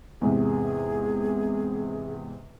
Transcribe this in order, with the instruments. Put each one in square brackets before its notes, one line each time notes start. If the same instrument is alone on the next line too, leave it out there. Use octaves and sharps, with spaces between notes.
[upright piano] E2 G#2 C3 [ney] G#4